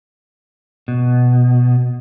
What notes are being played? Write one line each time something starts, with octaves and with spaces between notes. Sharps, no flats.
B2